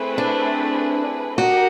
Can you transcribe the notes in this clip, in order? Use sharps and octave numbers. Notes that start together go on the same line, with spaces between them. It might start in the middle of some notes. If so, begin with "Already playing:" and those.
Already playing: A3 C4 E4 G#4 B4
D4
F#4 G4 A#4 D#5